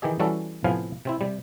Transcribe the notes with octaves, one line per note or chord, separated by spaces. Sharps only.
D#3 E3 G4 G#4 D#5
E3 G3 C#4 F#4 A4
A2 C3 F3 B3 F5 G#5
C3 C4 E4
C3 G3